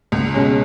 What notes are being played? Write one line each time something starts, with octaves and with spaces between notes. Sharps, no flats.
C#2
B2 G#3 C#4